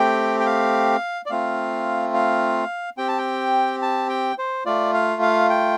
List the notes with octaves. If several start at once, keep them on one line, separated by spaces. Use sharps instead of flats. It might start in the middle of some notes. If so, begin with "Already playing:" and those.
Already playing: A3 C4 G4 G5
G5
F5
D5
A3 C4 F4 F5
F5
C4 G4 G5
A5
G5
A5
G5
C5
A3 F4 D5
F5
F5
G5